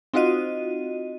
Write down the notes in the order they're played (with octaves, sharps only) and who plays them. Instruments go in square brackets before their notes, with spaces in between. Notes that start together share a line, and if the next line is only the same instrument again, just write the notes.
[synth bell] C4 D#4 F4 F#4 D#5 D#7